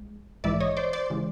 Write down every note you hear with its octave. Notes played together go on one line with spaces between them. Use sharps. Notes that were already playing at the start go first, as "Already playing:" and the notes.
Already playing: A#1 G#3
A#1 G#2 E3 G#3 D5 E5
C#5 D#5
C5 D5
C5 D5
C#3 E3 G#3